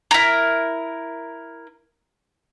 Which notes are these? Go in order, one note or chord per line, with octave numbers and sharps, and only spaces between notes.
E4 A#4